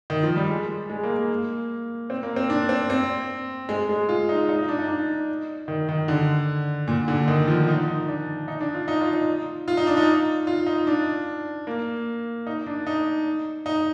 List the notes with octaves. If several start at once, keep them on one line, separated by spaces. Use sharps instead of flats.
D#3
F3
G3
G#3
G#3
A#3
A#3
C4
A#3
C4
D4
C4
C4
G#3
G#3
F4
D#4
D#4
D#4
D4
D#4
D4
D#3
D#3
D3
A#2
D3
D#3
F3
D#4
D#4
D4
D#4
D4
F4
D#4
F4
D#4
F4
D#4
D4
D#4
F4
D#4
D4
A#3
D#4
D4
D#4
D#4